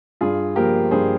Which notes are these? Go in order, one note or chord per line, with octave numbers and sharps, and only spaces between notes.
G2 F4 G#4
F3 A#3 G4 A#4
G2 G#4 C5